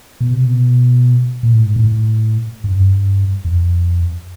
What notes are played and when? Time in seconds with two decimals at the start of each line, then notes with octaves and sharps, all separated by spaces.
0.21 B2
0.33 C3
0.45 B2
1.43 A#2
1.54 A2
1.65 G#2
1.76 A2
2.64 G2
2.71 F#2
2.79 G2
3.45 F2